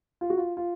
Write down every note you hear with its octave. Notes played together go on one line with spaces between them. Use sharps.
F4
F#4
F4
F4